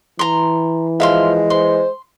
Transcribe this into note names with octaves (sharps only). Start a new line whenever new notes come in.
E3 A#5 C6
F3 G#3 E5 F5 C6
C5 C6